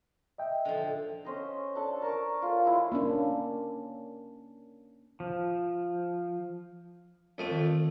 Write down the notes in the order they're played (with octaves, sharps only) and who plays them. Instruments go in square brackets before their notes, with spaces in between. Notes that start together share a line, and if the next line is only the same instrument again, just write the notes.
[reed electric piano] D#5 E5 G5
[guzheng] D3 F3
[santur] C#4 C5 D#5
D4 A4 A5
A#4 A5 C#6 D6
F4 A4 C#5 D5
G#3 E4
[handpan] A#3 C#4 D4
[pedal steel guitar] F3
[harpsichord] F2 A3
[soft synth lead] D#3